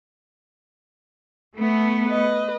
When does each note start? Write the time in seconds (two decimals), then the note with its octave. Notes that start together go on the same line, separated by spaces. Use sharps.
1.57 A3 B3
2.05 B4 D#5